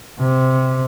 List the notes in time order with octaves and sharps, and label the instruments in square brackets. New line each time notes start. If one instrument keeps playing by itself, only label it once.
[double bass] C3